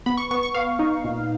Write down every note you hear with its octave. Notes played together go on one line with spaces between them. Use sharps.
B3 B5
C#6
B3 C#6
C#6
B3 F5
D#4
A#2